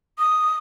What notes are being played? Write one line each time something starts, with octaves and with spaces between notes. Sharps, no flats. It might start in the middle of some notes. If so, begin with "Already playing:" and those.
D#6